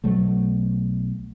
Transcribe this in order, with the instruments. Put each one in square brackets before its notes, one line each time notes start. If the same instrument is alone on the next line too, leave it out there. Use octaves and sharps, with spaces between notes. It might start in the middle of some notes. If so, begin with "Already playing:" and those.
[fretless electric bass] B1 F#3 A3